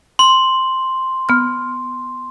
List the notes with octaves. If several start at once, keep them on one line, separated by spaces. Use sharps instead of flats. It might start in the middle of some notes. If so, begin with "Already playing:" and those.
C6
B3 F6